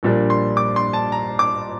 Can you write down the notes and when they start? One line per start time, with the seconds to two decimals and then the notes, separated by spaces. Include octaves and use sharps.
0.03 A#1 A#2 G3 D4
0.30 C6
0.57 D6
0.76 C6
0.93 A5
1.12 A#5
1.39 D6